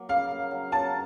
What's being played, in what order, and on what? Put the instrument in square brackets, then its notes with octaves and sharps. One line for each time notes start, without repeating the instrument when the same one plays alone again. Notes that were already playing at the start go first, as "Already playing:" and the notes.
Already playing: [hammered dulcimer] F#3 A#3
[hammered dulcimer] C#3 [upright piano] F5
[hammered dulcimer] A#3
F#3
[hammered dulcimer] F#3 [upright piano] A5